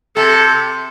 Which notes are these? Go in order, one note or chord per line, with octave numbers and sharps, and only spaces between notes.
C3 A4